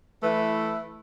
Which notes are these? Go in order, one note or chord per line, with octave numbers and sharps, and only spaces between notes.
E3 A3 E4 B4